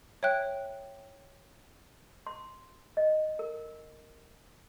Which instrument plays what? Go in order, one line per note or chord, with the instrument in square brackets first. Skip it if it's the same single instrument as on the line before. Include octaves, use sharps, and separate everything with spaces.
[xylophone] C#5 E5 G5 F#6
[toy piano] C6
D#5
A#4